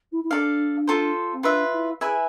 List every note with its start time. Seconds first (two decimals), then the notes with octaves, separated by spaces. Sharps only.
0.12 E4
0.24 E4
0.31 D4 A4 D5 F5
0.87 F4 A4 C5
1.32 C4
1.43 D4 F4 B4 E5
1.73 E4
2.00 E4 G#4 B4 E5 G#5